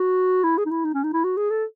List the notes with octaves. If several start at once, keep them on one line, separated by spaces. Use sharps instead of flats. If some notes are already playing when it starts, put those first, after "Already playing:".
Already playing: F#4
E4
G#4
D#4
E4
D#4
C#4
D#4
E4
F#4
G#4
A4